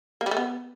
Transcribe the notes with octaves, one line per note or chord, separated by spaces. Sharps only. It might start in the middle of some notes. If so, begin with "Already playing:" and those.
A#3
G3
A3
B3